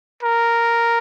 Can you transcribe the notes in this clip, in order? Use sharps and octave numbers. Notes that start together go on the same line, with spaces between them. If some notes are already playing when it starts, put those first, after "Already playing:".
A#4